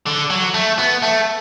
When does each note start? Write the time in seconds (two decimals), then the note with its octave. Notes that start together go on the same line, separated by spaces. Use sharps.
0.06 D3
0.30 F#3
0.54 A3
0.79 B3
1.03 A3